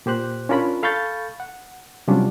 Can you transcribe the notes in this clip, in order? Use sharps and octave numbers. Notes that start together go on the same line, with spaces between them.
A#2 G4 C5 F#6
C#4 D4 F4 A#4 C#5 B5
A4 F5 B5 C#6 G6 A6
F#5
C3 F#3 G3 C#4 D4 F4